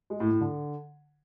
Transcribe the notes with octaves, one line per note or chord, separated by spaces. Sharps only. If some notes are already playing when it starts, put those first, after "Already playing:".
G#3
A2
A2
D3